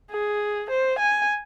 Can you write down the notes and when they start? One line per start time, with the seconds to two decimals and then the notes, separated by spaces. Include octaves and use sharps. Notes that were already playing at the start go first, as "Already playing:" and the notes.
0.11 G#4
0.70 C5
0.99 G#5